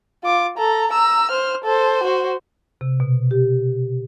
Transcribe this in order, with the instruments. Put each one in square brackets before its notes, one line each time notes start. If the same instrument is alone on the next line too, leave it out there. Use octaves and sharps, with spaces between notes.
[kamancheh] F4 D6
A4 A#5
A#5 E6
C5 F6
A4 C5
F#4 C5
[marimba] C3
B2
G4